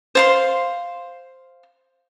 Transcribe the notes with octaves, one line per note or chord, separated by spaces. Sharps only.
C5 F5 C6